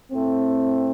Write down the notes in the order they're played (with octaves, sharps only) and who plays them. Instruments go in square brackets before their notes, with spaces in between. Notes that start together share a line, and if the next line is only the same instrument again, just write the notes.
[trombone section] A2 A3 C4